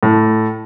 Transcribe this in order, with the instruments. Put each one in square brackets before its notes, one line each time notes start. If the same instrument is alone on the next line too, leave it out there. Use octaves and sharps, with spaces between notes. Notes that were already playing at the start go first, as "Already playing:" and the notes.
[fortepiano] A2